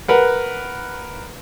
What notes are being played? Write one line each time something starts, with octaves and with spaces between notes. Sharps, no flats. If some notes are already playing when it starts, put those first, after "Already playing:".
A#4 B4 F#5